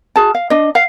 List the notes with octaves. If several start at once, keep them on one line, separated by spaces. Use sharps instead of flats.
F#4 G#4 A5
F5
D4 D#5
F5 F#5